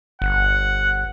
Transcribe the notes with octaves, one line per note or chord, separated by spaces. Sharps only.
G1 F#5